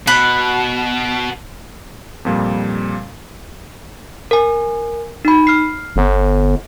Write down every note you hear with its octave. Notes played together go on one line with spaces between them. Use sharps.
B2 F#5 B5
F2 A#2 G3
A#4 G#5
D#4 B5
F6 C7
G1